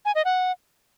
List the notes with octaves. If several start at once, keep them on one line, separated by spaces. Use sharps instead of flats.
G#5
D#5
F#5